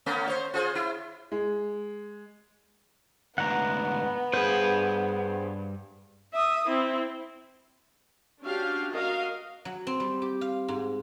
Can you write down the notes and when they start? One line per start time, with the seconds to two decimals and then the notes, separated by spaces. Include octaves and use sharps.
0.06 A3 B3 C#4
0.27 C5 C#5
0.54 F4 G#4 C5
0.75 E4
1.32 G#3
3.38 D2 G#2 B3 F#5 A#5
4.34 G2 G#4 B4 C5
6.34 E5 D#6
6.68 C4 E4
8.43 C#4 D4 F#4 G4 F5
8.90 F#4 A#4 D#5 F5
9.65 F#3
9.87 C4
10.00 G3
10.22 G4
10.41 F5
10.68 G#2